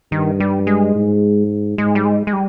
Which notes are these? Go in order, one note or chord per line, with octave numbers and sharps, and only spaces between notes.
G2 D#3
G3
G#3
G#2
G#2 G#3
G3
G#3
G#3
G3